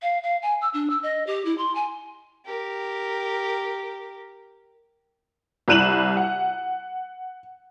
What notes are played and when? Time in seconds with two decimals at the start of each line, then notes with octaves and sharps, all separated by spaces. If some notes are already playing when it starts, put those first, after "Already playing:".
0.02 F5
0.23 F5
0.42 G#5
0.61 E6
0.74 D4
0.90 E6
1.03 D#5
1.27 G4
1.45 E4
1.58 C6
1.75 G#5
2.45 G4 A#4
5.68 C2 E4 F#6 D#7 E7 F#7
6.17 F#5